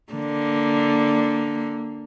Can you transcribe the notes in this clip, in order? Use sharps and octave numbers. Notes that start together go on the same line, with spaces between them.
D3 A#3